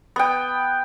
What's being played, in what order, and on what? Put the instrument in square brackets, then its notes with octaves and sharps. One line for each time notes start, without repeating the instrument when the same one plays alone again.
[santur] B3 G5